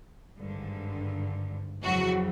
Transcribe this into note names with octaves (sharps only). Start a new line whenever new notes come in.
G#1 G2 D3
F2 C#3 E3 F#3 F#4